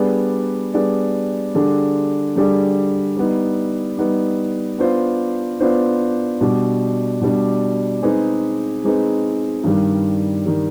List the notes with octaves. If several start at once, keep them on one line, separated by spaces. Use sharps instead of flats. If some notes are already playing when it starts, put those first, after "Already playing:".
Already playing: G3 B3 D4 G#4 D5
G3 B3 D4 G#4 D5
D3 G3 D4 G#4
D3 G3 D4 G#4
G3 B3 D#4
G3 B3 D#4
B3 D4 F4 C5
B3 D4 F4 C5
B2 G3 D4
B2 G3 D4
G#3 C4 D#4 G#4 B4
G#3 C4 D#4 G#4 B4
G2 D#3 G3
D#3 G3